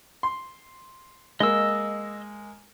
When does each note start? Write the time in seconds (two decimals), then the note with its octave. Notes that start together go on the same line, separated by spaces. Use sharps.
0.23 C6
1.40 G#3 A#3 D#5 E6